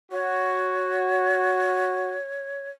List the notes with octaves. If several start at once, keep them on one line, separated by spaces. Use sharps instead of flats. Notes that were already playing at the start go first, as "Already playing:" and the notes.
F#4 C#5